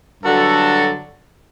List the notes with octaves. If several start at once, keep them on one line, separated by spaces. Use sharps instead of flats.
G2 D3 F#3 F#4 A4